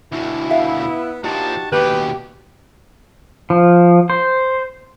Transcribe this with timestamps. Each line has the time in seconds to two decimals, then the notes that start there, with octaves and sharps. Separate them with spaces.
0.12 D2 B2 E4
0.50 B3 B4 E5 F5
1.24 A#2 F3 D#4 F#4 G4 A5
1.72 D#2 B2 G4 B4
3.50 F3
4.10 C5